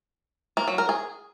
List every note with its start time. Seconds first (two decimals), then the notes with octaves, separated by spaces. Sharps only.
0.57 A#3
0.68 F#3
0.78 A#4
0.89 G#4